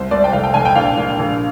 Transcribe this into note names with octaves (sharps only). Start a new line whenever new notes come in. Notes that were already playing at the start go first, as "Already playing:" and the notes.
Already playing: C2 C5
C2 D5
G5
F1 F5
G5
F1 G#5
G5
A#1 F5
A#1
A#1